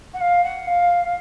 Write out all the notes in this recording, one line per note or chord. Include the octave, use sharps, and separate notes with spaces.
F#5
F5
F#5
F5